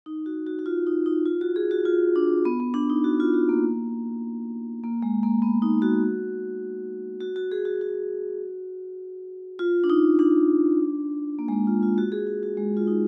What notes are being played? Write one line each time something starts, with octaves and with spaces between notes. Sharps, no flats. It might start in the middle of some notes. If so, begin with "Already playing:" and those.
D#4
F#4
F#4
F#4
F4
D#4
D#4
F4
F#4
G#4
F#4
F4
D4
B3
B3
D4
D#4
F#4
F4
F#4
A#3
A#3
G#3
A#3
B3
D#4
F#4
F#4
F#4
G#4
F#4
F#4
F4
D4
D#4
D4
A#3
G#3
A#3
F4
F4
F#4
G#4
F#4
F#4
G#3
F4
D#4